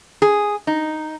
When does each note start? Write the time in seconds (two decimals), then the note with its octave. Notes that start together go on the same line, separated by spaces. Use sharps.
0.22 G#4
0.67 D#4